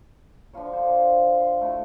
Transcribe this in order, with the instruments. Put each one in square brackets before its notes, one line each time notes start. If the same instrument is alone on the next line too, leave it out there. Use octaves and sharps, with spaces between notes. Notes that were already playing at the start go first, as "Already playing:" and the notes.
[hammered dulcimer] D3 F3 F4 C#5
C5
C6
A3 E4 F#4